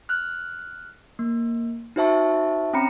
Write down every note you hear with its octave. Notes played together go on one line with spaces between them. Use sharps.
F6 F#6
A#3
D#4 F#4 C5 E5 A5 C#6
C4 C#4 G5 A#5 B5 C#7